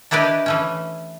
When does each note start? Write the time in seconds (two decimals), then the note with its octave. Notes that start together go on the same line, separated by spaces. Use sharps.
0.11 D4 E4 G4 B4 D5 D#5
0.46 E3 A3 C#4